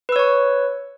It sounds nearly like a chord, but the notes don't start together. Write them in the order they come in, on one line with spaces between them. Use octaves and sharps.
B4 E6 C#5 C#6